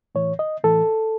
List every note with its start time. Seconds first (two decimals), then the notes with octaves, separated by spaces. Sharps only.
0.15 A2 E3 C#5
0.39 D#5
0.64 A2 E3 A4